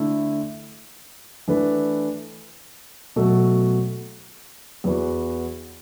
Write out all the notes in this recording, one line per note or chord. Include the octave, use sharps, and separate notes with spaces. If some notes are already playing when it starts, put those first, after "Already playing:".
Already playing: D3 A3 E4 A4
E3 A3 D4 B4
B2 F#3 A3 F#4 A4
E2 E3 B3 F#4